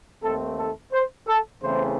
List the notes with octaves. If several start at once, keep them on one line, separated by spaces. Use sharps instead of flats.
D#2 D#3 A3 C4 A4
A4
C5
A4
E2 C#3 E3 A3 C4 C5